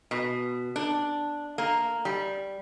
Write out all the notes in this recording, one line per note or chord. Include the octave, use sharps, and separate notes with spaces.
B2
D4
A#3
G3